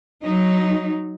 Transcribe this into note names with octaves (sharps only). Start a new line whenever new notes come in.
F#3 D#4